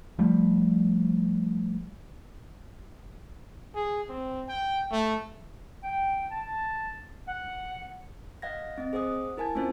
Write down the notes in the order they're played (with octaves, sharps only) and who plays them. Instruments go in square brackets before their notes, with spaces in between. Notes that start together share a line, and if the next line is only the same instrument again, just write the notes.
[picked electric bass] F3 G3 A3
[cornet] G#4
C4
G5
A3
[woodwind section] G5
A5
F#5
[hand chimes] D#5 F5 F#5 G#6 A#6
C4 D#5
G#4 C5 F#5 D#6
E4 A#4 G#5 A5 G#6
A#3 C4 C#4 F4 C5